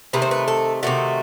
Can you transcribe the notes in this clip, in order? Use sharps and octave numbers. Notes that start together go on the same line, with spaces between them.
C3 D#3 A3 B4
C5
B4
A4
C3 D#3 A3 F#4